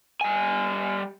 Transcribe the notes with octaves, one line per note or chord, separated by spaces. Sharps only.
G3 G#5